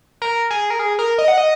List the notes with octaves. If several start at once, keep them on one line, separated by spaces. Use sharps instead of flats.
A#4
G#4
A#4
G#4
A#4
D#5
F#5
D#5